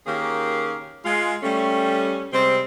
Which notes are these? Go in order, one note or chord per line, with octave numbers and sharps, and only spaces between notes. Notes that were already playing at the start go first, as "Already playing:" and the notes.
D#3 A#3 C#4 G4 G#4 A#4
G#3 F4
G3 A3 C#4
C3 G3 G#3 C4